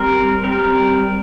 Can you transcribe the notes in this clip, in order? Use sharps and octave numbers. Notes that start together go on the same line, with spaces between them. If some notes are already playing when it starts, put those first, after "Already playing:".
Already playing: G3 C4 A#4
G3 C4 A#4